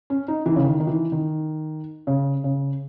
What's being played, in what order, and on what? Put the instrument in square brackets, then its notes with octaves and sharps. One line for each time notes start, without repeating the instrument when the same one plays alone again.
[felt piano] C#4
D#4
E3
C#3
D#3
D#3
E3
D#3
C#3
C#3